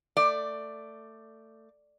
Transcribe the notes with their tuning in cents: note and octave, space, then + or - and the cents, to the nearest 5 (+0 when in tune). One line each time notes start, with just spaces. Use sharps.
A3 +20 D5 +5